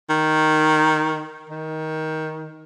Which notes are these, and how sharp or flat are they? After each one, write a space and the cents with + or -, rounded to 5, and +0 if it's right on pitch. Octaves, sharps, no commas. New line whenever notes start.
D#3 +0
D#3 +15